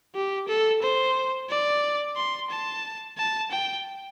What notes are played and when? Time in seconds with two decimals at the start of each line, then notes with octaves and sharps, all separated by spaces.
0.15 G4
0.48 A4
0.82 C5
1.49 D5
2.16 C6
2.50 A5
3.18 A5
3.51 G5